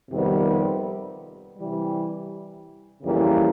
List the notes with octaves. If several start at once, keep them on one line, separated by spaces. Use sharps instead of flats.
F2 C3 D#3 G3 B3
C3 E3 G3
F2 C#3 E3 G3 A#3